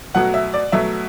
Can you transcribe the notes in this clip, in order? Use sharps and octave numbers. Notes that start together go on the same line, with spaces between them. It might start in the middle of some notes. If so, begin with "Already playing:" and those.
B2 F#3 A3 F#5
E5
D5
B2 F#3 A3 E5